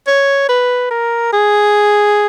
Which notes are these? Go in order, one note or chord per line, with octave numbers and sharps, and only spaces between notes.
C#5
B4
A#4
G#4